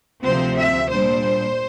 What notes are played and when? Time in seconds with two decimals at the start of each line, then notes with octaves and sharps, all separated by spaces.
0.23 D2 C3 F3 C4 C5
0.56 E5
0.89 A#2 G3 D4 C5